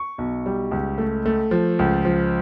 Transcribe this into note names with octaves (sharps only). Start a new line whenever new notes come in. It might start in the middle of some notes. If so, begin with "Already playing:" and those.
Already playing: C#6
B1
G3
C#2
A3
A3
F3
C#2
F3